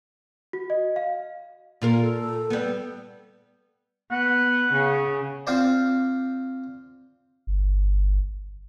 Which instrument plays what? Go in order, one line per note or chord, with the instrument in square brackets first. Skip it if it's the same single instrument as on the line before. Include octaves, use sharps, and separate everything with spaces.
[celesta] F#4
D#5
F5
[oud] A#2 F4 A#4
[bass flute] A4
[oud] G3 B3
[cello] B3 [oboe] F#5
[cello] C#3
[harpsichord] C4 F4 C5 D5
[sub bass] G1